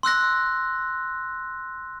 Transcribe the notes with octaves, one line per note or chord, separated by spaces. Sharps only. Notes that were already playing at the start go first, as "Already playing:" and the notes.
C6 E6 F#6 A#6